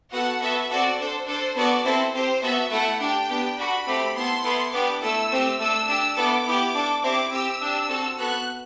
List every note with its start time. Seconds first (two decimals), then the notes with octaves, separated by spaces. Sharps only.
0.12 B3 F#4 A4 F#5
0.41 B3 F#4 A4 E5
0.70 C4 F#4 A4 D5
0.98 D4 A4 C5
1.27 D4 A4 C5
1.56 B3 F#4 A4 D5
1.85 C4 E4 A4 C5
2.13 C4 G4 C5
2.42 B3 F#4 A4 E5
2.71 A3 E4 A4 F#5
3.00 D4 G4 G5
3.29 B3 D4 G4
3.58 D4 F#4 A4 B5
3.87 A3 C4 G4
4.15 B3 E4 A4 C6
4.44 B3 E4 A4
4.73 B3 D4 G4 D6
5.02 A3 E4 A4 E6
5.31 A3 C4 G4
5.59 A3 D4 A4 E6
5.87 D4 G4 E6
6.16 B3 E4 A4 D6
6.46 B3 E4 G4
6.74 D4 A4
7.03 C4 E4 G4 D6
7.31 C4 G4 E6
7.61 D4 G4
7.89 C4 F#4 A4
8.18 B3 F#4 A4 F#6